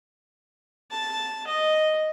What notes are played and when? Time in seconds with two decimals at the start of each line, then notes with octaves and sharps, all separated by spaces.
0.90 A5
1.47 D#5